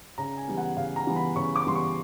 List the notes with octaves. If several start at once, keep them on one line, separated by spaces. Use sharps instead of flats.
C#3 A#5
G#5
E3 G3 B3
F#5
C#3 F5
A#5
E3 G3 B3
B5
C#3 C#6
D6
E3 G3 B3 C6
C#6